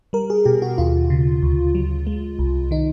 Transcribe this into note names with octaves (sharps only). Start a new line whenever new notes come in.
G3 A#4
G#4
B2 G4
F#4
D#2 F4
C#3
D2
F#3
G#3
C2
D#3 D#4